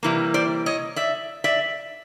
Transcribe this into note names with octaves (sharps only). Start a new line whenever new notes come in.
C3 E3 G3 A#3
C5 D5
C#5 D#5
D5 E5
D5 E5